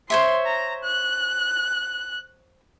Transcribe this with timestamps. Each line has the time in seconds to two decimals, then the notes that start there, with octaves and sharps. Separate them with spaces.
0.10 C5 C#5 E5 C6
0.46 A#5
0.84 F#6